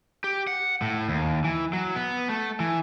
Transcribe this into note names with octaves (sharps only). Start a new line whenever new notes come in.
G4
F#5
A2
D#2
E3
F#3
B3
A3
E3